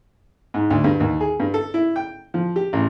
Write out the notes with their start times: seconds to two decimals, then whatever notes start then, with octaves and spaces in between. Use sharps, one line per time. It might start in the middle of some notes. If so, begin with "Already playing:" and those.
0.54 G#2
0.70 D2
0.84 G2
1.00 D#2
1.21 G#4
1.40 G2
1.54 A4
1.74 E4
1.96 G5
2.34 F3
2.56 G4
2.73 A1